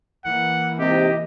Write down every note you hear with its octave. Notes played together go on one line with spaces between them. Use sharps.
E3 A#3 F#5
G#2 C3 G4 D#5